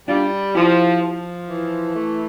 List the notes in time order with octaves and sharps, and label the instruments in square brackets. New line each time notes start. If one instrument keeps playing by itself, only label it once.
[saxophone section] G3 [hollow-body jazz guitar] D4 F4
[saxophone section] F3 [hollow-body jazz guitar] E4 G4
[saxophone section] F3
E3
A3